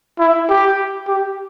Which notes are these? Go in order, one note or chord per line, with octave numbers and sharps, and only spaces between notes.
E4
G4
G4